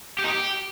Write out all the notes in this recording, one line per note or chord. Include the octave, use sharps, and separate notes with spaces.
G4
D#4
G4